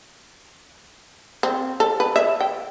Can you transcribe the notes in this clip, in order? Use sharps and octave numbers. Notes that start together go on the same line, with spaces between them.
C4
A4
B4
E5
G5